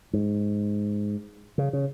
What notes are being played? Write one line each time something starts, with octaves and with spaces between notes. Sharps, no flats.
G#2
C#3
C#3